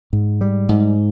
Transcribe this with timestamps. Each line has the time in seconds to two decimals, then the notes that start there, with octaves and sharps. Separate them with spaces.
0.13 G#2
0.41 G3
0.69 G#2